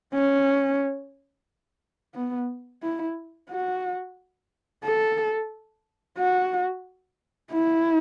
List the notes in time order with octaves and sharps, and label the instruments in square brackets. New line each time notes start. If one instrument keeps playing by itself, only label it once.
[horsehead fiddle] C#4
B3
E4
F#4
A4
F#4
E4